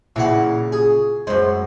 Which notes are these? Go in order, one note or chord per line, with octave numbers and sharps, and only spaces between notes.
A#2 C#3 E3 F#5
G#4
F#2 G#3 C5